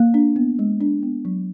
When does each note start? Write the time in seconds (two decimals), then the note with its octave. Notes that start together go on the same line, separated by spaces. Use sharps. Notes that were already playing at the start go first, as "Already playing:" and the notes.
Already playing: A#3
0.14 D4
0.36 B3
0.59 G#3
0.80 D4
1.03 B3
1.25 F#3